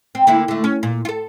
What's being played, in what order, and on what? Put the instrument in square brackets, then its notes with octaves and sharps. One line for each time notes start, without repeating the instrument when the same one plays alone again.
[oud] C4
D3 A#3 E4
D3 A3
C#4
A#2
F4 A4